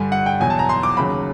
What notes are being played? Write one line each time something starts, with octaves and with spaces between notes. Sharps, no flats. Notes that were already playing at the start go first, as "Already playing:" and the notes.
Already playing: G2 D3 G3 G#5
F#5
G5
E2 B2 F#3 G#5
A5
A#5
C6
D6
D#2 C#3 F#3 B5